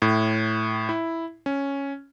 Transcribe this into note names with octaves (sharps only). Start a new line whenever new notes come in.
A2
E4
C#4